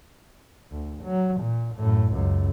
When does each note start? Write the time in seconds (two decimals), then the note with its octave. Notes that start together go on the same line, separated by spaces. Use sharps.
0.72 D2
1.04 F#3
1.41 A#2
1.75 F#2 A2
2.13 C#2 F#2